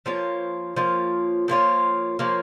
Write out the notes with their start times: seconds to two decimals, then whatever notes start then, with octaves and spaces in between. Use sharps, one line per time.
0.06 F3 A#3 F4 C#5
0.76 F3 A#3 F4 C#5
1.48 F3 A#3 F4 C#5
2.19 F3 A#3 F4 C#5